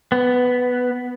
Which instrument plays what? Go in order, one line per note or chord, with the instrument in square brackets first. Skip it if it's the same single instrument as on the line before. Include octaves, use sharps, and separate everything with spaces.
[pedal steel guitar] B3